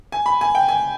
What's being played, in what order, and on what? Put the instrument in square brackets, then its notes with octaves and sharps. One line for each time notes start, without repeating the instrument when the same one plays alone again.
[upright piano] G#5
B5
G#5
G5
G#5